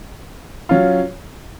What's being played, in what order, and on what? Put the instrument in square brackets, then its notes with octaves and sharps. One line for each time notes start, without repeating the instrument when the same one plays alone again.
[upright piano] F#3 C#4 F4